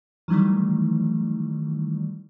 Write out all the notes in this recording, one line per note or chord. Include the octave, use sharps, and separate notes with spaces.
D#3 E3 F#3 G3 A3